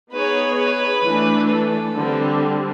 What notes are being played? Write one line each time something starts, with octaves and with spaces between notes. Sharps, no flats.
B3 D#4 G#4 B4 C#5
B4
E3 A3 D4
A4
D3 G3 C4